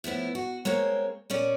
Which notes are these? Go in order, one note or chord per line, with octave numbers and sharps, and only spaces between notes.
A2 F3 B3 E4
F#4
G#3 A#3 C4 C#5
A#2 C#4 D5 G#5